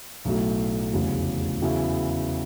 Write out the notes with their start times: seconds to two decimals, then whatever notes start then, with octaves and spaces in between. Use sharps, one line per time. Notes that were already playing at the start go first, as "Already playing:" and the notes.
0.25 B1 A2 F#3 A3
0.93 F1 E2 C#3 F#3
1.62 E2 C#3 F#3 B3 E4